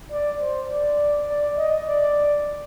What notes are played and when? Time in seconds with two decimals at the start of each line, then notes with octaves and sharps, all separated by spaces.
0.11 D5
0.40 C5
0.70 D5
1.28 D5
1.57 D#5
1.87 D5